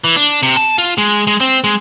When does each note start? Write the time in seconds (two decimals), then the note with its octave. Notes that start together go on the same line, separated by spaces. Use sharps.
0.04 E3
0.16 D4
0.43 C3
0.56 A5
0.78 F4
0.98 G#3
1.27 G#3
1.40 C4
1.64 G#3